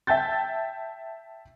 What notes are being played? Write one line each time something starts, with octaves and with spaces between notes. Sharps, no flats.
E5 G5 A5 G6 A6